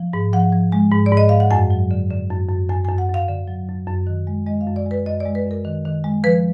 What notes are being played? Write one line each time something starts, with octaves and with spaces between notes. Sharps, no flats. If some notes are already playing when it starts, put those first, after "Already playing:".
Already playing: F3
G#2
F3 F#5
F3
G#3
G#2
D5
G#2
D#5
G#2 F5
F#5
F#2 G#5
F#3
D3
D3
F#2
F#2
F#2 G#5
F#2 G#5
F#5
F#2 F5
D3
F#3
F#2
F#2
D#3
G#3
G#3 D#5
F5
F#2
D5
G#3 B4
F#2 D#5
D5
G#3
B4
F#2 A#4
D#3
D#3
G#3
F3 B4